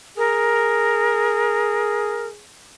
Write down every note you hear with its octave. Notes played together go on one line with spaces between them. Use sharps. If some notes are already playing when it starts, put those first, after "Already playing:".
G#4 A#4